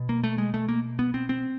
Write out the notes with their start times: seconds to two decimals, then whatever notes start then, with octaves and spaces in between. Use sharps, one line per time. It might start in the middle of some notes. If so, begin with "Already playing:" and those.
Already playing: B2
0.09 A#3
0.24 A3
0.38 G#3
0.54 A3
0.69 A#3
0.99 B3
1.14 C4
1.29 C4